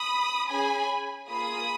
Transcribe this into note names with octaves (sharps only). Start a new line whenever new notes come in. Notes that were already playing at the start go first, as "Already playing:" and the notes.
Already playing: B5 D#6
C#4 G#4 G#5 B5
A#3 F4 G#4 B5 D#6